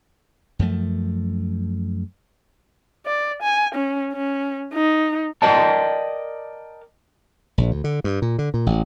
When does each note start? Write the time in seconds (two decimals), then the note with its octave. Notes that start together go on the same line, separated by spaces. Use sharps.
0.59 F#2 F3 A3
3.06 D5
3.42 G#5
3.75 C#4
4.13 C#4
4.73 D#4
5.42 A#4 D5 D#5 G5 A5
7.58 A#1
7.71 D2
7.84 D3
8.04 G2
8.22 A#2
8.39 D3
8.54 A#2
8.66 A1